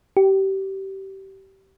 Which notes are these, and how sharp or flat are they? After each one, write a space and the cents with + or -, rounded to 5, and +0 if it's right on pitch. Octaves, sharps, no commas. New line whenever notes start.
G4 -25